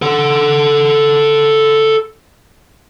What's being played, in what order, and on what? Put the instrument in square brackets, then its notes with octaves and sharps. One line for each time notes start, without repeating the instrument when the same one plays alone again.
[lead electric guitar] A4 F#5